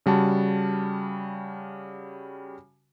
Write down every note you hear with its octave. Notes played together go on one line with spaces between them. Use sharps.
C#3 G3 F#4 A5